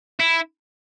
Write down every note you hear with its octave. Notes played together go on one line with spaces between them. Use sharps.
E4